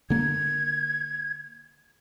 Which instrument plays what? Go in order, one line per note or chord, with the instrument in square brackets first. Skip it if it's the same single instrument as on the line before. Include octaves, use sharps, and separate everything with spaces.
[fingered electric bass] D3 A#3 [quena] G#6